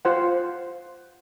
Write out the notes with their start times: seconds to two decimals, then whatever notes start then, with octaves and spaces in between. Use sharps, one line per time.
0.05 F4 C5 F#5